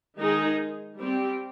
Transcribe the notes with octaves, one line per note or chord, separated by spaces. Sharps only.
D#3 G#3 D#4 G#4
G3 C4 G4